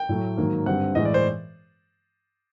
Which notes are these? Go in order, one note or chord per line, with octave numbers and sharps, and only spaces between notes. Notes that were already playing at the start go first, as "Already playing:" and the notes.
Already playing: G5
A2 F#3 A3
G#2 D#3 F#3 A#3
G2 D3 G3 C4 F#5
A2 E3 G#3 D#5
D5
C5